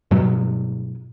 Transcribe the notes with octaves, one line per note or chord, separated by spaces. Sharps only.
G2 B2 F#3